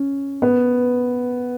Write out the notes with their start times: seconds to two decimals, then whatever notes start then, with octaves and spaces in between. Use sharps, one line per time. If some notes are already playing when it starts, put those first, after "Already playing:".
Already playing: C#4
0.42 B3